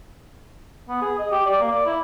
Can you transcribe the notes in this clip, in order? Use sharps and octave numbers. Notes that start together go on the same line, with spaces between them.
B3
G#4
D#5
G4
D5
A#3
D5
E4